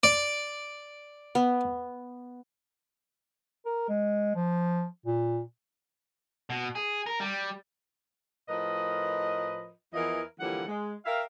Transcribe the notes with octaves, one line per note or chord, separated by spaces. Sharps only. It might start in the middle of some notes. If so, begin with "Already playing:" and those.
D5
B3
A#4
G#3
F3
A#2
B2
G#4
A#4
G3
A2 F3 A#4 B4 D#5
E2 E3 F3 E4 A#4 D#5
D3 E3 F3 G3 A#3 F#5
G#3
G4 A#4 E5 F5